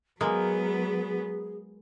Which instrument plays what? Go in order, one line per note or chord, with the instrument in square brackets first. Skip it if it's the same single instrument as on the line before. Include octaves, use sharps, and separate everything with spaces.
[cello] F#3 B3 [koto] G#3 A#3 [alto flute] G#4